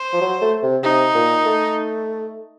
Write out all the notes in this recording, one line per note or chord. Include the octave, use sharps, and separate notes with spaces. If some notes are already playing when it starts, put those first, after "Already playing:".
Already playing: C5
F3
F#3
A3
C3
C3 D#4
A#2
A3